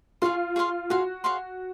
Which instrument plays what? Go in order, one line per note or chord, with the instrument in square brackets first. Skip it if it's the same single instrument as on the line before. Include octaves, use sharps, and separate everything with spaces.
[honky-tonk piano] F4 [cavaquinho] G#4 C#5 F5 C6
[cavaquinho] G#4 C#5 F5 C6
[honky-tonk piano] F#4 [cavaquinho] G#4 C#5 F5 C6
[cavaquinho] G#4 C#5 F5 C6